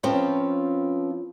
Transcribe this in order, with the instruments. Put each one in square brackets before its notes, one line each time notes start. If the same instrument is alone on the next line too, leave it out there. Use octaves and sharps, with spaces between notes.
[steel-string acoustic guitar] F3 C4 C#4 F4 B4